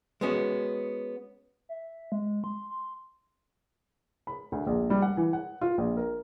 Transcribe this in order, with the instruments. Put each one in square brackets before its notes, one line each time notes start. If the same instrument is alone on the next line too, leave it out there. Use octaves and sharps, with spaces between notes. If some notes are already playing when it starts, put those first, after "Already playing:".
[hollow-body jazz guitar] G#3 B3 C#4 F#4
[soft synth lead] E5
G#3
C6
C6
[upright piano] B5
D2
A#1
G3
F#5
E3
F#5
F4
A#1
A#4